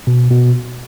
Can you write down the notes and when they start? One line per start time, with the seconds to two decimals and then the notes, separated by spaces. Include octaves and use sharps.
0.07 B2
0.31 B2